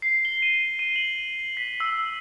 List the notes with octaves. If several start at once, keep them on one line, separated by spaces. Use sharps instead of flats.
C7
G7
D#7
D#7
F#7
B6
E6